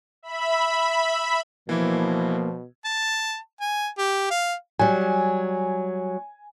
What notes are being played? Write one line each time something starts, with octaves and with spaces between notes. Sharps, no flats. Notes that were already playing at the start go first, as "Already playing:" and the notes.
E5 B5
B2 E3 F3 A#3 E4
A5
G#5
G4
F5
F#3 G3 G#5